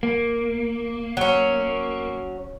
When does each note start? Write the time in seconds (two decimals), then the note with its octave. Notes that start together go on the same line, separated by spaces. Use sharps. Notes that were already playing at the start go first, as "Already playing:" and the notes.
0.03 A#3
1.17 F#3 C#4